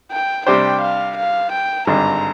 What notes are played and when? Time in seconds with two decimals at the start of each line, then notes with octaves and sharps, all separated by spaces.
0.11 G5
0.47 C3 G3 D4 G4 C5 G5
0.82 F5
1.17 F5
1.52 G5
1.87 G#1 G2 D3 A#5